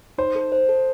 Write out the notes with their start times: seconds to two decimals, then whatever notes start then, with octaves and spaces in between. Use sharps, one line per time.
0.18 D#4 C5
0.35 A4
0.52 C5
0.69 A4